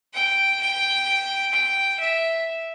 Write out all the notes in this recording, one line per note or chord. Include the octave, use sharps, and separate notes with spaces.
G5
G5
G5
E5